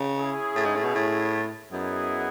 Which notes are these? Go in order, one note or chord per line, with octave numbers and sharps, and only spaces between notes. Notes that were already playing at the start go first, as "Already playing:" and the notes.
Already playing: C#3
C#4 E4 G#4
A2
G#2
A2
B2
A2
F#2 B3 E4 G#4 D#5 F#5